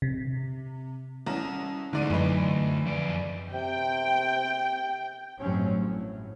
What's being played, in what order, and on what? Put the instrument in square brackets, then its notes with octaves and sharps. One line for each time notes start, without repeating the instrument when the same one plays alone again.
[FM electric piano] C3
[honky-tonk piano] C2 C#4 A#5
[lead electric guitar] D2 [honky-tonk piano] G#2 D5 D#7
[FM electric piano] F#2 B5 [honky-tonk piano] E3 D#4
[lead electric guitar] F2 D5
[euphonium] C3 [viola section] G5
[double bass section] A1 G2 F#3 C4 C#4
A2